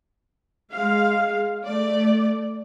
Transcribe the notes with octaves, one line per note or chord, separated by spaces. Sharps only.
G#3 F5
A3 D5